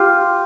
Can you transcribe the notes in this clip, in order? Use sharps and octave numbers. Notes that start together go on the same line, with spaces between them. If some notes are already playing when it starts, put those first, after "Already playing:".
Already playing: F4 G4